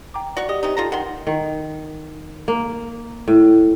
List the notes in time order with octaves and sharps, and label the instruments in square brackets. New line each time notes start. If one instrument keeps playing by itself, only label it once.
[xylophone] G5 A#5 D6
[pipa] F#4 C#5 C#6 [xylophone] D5
[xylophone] G4 [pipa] D#5
[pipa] C3 D#4
F4 A4 A#5
[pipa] D#3 C6 [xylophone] F#5
[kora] D#3
A#3
A2